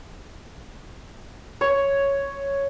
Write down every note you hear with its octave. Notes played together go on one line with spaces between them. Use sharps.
C#5